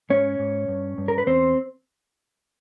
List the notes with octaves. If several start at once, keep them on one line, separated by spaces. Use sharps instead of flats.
G#2 C#4 C#5
G#2
G2
G2
A#4
B4
E2 C4 C5